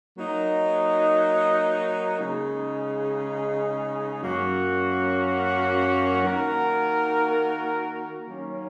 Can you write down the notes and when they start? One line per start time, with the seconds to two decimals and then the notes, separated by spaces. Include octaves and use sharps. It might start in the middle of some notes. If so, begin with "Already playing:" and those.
0.17 F#3 A#3 D#4
2.20 C#3 G#3 D#4 G#4
4.22 F#2 F#3 A#3 C#4 F#4
6.24 D#3 A#3 F#4 A#4
8.27 D#3 F#3 A#3 C#4